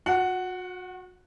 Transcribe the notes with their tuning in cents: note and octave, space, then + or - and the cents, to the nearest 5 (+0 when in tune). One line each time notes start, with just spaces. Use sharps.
F#4 -35 F#5 +5